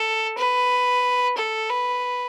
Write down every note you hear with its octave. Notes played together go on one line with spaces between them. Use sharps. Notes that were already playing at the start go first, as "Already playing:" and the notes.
Already playing: A4
B4
A4
B4